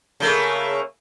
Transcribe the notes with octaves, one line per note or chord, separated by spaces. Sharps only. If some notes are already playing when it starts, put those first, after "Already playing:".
C#3 A3 A#3